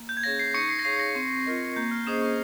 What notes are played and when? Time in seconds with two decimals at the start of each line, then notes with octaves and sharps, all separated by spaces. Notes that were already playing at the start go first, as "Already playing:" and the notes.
Already playing: A#3
0.09 G6
0.17 G#6
0.23 C#4 G#4 C#5 F5 A#6
0.39 C7
0.54 D#4 C#6 C#7
0.69 C7
0.79 A#6
0.85 G#4 C#5 F5 C7
0.99 A#6
1.15 C4
1.46 F4 A#4 D#5
1.76 A#3 G6
1.91 F6
2.07 C#4 G#4 C5 D#5 D#6
2.22 C#6